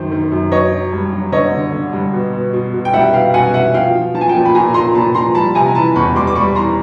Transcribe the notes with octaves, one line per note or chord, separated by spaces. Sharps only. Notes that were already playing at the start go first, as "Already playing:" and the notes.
Already playing: F#2 D#3 F#3 C5
D#3
F#2
F#3 C#5 D#5
F#3
G2
F#3
D3 C#5 D#5
D3
D3
G2
B2
B2
B2
B2
G5
G3 E5 F#5
B2 F5 G5
B2 F#5 G#5
B2 E5 F#5
F3 F5 G5
F3
F3 A5
G#5
G5 A5
A#2
B5
A#2 G#5 A#5
A#2 A#5 C6
A#2 A5 B5
F3 A#5 C6
G3 A5 B5
C3 G#5 A#5
A#5
E3 A5 B5
E2 B5 C#6
G3 C6 D6
D6
G3 B5 C#6
E3 A#5 C6